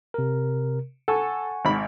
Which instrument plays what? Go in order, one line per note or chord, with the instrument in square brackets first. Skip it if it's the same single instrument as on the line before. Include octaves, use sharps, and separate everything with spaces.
[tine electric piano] C3 A#4
[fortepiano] A4 [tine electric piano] F#5 G#5 C#6
[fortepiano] G#1 B5